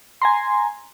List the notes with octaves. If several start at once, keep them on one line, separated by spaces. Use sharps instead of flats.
G#5 A#5 C6